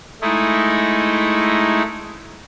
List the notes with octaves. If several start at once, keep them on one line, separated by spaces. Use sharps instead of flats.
G#3 A3 D#4 E4